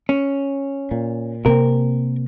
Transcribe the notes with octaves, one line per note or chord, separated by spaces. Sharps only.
C#4
A#2
C3 A#3 C4 A#4